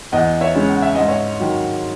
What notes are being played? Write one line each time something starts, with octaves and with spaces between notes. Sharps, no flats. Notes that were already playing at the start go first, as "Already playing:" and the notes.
E2 D#5 F#5
C#5 E5
C#3 G#3 C#4
F#5
E5
G#2 D#5
C#5 E5
D#3 F#3